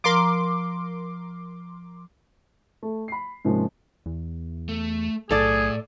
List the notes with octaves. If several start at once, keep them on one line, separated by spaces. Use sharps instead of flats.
F3 A#4 C6 D6
A3
B5 C7
G#2 C3 F3 G#3 A#3 C#4
E2
A3
B1 A2 G#4 A4 D5